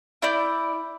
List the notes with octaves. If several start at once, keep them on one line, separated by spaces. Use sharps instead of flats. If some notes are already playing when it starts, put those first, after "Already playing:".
E4 D5 G6